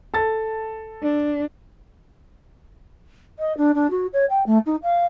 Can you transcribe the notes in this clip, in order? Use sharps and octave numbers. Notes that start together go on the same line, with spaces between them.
A4 A5 A6
D4
D#5
D4
D4
F#4
C#5
G5
A3
D#4
F5